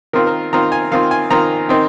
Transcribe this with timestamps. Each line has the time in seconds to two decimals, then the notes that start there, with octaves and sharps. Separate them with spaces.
0.13 D#3 C4 F4 A#4
0.27 A#4
0.53 D#3 C4 F4 A#5
0.72 G#5
0.92 D#3 C4 F4 F5
1.11 G#5
1.30 D#3 C4 F4 A#5
1.69 D#3 C4 D#4